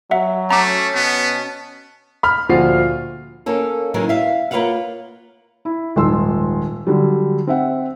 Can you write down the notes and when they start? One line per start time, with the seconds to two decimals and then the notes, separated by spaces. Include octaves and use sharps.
0.11 F#3 E5 F#5
0.51 A3 C#4 A5 A#5 D6
0.95 B2 B3
2.23 B5 F6
2.49 D2 A#2 F3 F4 F#4 C7
3.46 A#3 C#4 A4
3.94 D#3 E3 F#3 G#3 A#3 C#4
4.09 E5 F5
4.51 A#3 F4 B4 C#5 F5 F#5
5.65 E4
5.96 D#1 G#2 F3 C6 E6
6.87 D3 F#3 G3
7.47 C4 E5 F#5